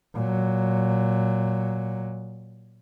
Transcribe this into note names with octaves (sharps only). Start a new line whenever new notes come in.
A#2 F#3